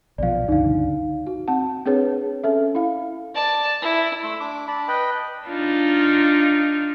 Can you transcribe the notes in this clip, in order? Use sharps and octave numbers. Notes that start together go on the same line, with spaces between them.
A#1 B2 F3 D5 F5
C#2 G2 D3 D#4 F5
F#4
C4 F#5 A5
C4 D4 G#4 B4 C#5
C#4 A4 E5
E4 F5
D5 A5
E4
A3 C6 E6
D4 D6
D4 A5 B5
B4 D#5 G5 B5
D4 D#4 F4